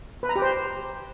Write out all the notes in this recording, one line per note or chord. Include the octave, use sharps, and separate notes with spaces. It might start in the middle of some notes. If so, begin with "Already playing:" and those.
B4
A#5
G4
C5